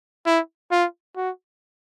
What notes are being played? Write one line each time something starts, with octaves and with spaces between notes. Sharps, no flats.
E4
F4
F#4